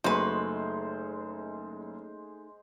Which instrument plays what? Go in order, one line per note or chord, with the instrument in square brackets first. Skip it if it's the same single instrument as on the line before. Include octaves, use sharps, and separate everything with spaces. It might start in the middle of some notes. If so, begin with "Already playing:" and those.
[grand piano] F#1 [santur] G#3 C5 [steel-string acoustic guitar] A3 D#4 [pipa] F#4 B4